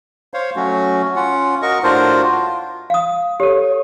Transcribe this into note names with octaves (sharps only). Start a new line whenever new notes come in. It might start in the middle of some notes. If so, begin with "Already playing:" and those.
C5 C#5 F5
F#3 A3 C#4 F#4
C#4 F4 F#5
F#4 A#4 D#5 C#6
A2 D4 F4 F#4 A#4 C5
F4
F5 D#6
G4 A4 C#5